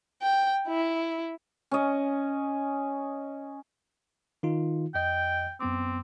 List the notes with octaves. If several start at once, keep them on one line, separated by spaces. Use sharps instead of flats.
G5
E4
C#4 D#5
D#3 D#4 F4
F2 D#5 G5 G6
F#2 B3 C4 D6